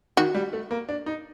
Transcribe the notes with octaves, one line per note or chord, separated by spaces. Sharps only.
D#3 F#4
G3
A3
A#3
D4
D#4